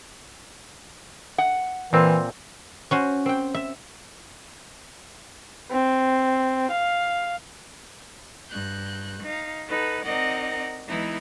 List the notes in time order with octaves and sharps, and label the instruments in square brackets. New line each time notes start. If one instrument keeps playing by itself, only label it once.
[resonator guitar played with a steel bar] F#5
[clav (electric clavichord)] A#2 C4 [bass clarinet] E3
[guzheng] C#4 F#4 C5
C4 G5
E5
[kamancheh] C4
F5
[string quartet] G2 F#6 G6
D#4 F5
D#4 A4 B4 F#5
C4 D#4 A#4 D5 D#5 F#5
E3 G#3 B3 D#4 E4